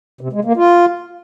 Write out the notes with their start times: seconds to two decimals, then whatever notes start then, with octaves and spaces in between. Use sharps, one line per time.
0.21 C3
0.33 G#3
0.45 A#3
0.56 F4